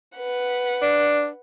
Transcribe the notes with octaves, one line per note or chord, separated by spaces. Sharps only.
B4 F#5
D4